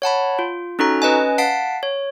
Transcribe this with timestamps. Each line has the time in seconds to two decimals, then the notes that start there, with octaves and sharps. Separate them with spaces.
0.02 C#5 F#5 A5 B5
0.39 F4
0.79 C#4 D#4 F#4 A4 A#5
1.02 C#4 B4 D#5 G#5
1.38 F5 F#5 A5 B6 C7 D7
1.83 C#5